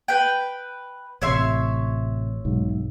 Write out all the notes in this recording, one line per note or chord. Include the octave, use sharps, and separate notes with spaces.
B4 G5
A1 C3 C#5 E5 C6
B1 G#2